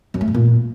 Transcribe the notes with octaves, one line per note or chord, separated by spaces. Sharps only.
F#2
A3
G#2
A#2